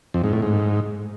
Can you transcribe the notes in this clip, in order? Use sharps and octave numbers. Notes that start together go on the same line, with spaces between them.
F2
G#2
A2
G#2